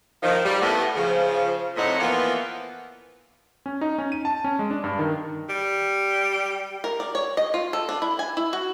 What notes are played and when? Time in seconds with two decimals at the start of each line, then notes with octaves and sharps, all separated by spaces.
0.23 D#3 F3
0.45 G3
0.62 A2 A3 B3
0.96 C#3 F3
1.76 F2 A2 C4 D#4 C#5 F#5
2.00 E3 F3 A#3 B3
3.66 C#4
3.81 D#4
3.98 C#4
4.12 D#7
4.25 A5
4.44 C#4
4.59 G#3
4.71 D4
4.84 G2
4.99 D#3
5.49 G3
6.84 A#4
7.00 D5
7.15 C#5
7.37 D#5
7.54 F4
7.73 A4
7.89 D4
8.02 E4
8.19 G#5
8.37 E4
8.53 F#4